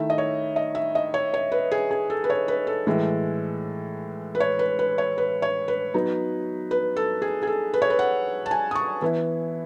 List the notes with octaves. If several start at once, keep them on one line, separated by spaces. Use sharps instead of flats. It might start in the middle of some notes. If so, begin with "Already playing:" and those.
Already playing: D#3 A3 E4 E5
D#5
C#5
D#5
E5
D#5
C#5
C#5
B4
G#4
G#4
A4
B4
C#5
B4
A4
A2 E3 G#3
B4
C#5
B4
B4
C#5
B4
C#5
B4
F#3 B3 D#4
B4
A4
G#4
G#4
A4
B4
C#5
B4
F#5
A5
G#5
D#6
C#6
E3 B3 E4